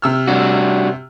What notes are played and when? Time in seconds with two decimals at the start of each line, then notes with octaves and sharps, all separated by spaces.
0.02 C3 E6 F6
0.27 G3 D4 F#4